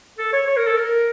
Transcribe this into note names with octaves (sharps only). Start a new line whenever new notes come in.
A4
C#5
C#5
A#4
A4
A#4